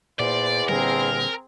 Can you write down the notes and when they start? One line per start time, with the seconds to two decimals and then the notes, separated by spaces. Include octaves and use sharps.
0.20 E2 A#2 C5 D5
0.69 A#2 D3 G3 C4 G#4 A#4